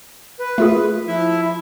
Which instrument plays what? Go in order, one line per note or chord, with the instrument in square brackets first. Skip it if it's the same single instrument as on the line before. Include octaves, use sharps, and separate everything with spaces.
[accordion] B4
[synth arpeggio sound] A3 F4 G#4
[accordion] F3 E4 E5